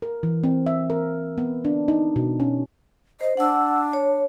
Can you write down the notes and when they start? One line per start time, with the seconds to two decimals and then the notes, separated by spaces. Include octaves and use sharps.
0.02 A#4
0.23 E3
0.44 C4
0.66 E5
0.90 A#4
1.38 B3
1.65 D4
1.88 D#4
2.16 B2
2.40 C#4
3.21 C5 D#5
3.37 D4 F#5 E6
3.93 C#5